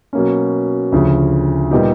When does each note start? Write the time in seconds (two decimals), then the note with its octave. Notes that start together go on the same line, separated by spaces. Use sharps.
0.13 B2 F#3 A#3 C#4
0.92 D2 C#3 F3
1.71 A#2 G3 B3 D#4 G4